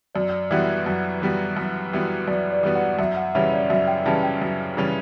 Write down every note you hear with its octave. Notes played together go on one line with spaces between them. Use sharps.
F#2 D5
E3 G3 B3 F#4 E5
F#2
E3 G3 B3 F#4
F#2
E3 G3 B3 F#4
F#2 D5
D5
E3 G3 B3 F#4
F#5
F#2 E5
F#5
C#3 E3 G3 C#4 E5
D5
F#2 E5
G5
C#3 E3 G3 C#4 A5
G5
F#2
C#3 E3 G3 C#4